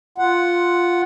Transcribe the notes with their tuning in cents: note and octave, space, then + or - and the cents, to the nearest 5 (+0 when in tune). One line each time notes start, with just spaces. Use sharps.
F4 +0 F#5 +0